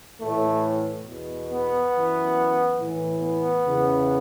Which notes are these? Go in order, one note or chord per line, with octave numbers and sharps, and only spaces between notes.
A2 E3 A3
E2 B2
B3
F#2 E3
A2 E3
B3
E2 C#3 E3